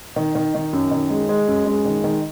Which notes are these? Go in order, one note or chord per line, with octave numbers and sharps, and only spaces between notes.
D#3
D#3
D#3
F#2
D#3
G#3
G#3
F#2
G#3
D#3
D#3